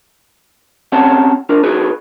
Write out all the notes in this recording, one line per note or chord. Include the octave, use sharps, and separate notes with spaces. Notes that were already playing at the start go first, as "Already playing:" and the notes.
C4 C#4 G4 C#5 F#5 A5
D4 F4 A#4
D#4 F#4 G#4 B4